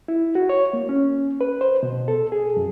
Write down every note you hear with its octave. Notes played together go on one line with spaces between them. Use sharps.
E4
F#4
C#5
A#3
C#4
B4
C5
B2
A4
G#4
F#2